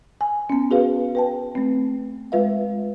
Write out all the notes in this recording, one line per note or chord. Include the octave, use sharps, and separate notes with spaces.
G#5
B3 C#4
F#4 G#4 B4 F5
B4 G5 A5
A3 C4
G#3 F4 B4 E5 F5